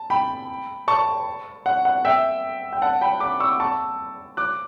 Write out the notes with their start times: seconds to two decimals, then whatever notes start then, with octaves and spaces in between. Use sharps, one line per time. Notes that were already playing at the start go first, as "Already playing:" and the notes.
Already playing: A5
0.10 G5 B5
0.88 A5 C#6
1.66 F#5
1.85 F#5
2.05 E5 G5
2.73 G5
2.82 F#5 A5
3.01 G5 B5
3.20 B5 D6
3.40 C#6 E6
3.60 A5 C#6
4.37 D6 F#6